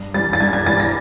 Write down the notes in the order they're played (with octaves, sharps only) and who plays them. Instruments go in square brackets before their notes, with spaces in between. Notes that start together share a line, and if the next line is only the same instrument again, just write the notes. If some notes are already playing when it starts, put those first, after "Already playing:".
Already playing: [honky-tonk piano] G2
E3 G3 A6
A6
G2 G#6
G#6
E3 G3 A6
A#6